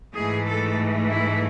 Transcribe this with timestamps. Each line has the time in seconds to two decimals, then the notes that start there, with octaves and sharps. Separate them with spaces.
0.14 G#2 E3 A3 G#4
0.46 A4
1.09 E4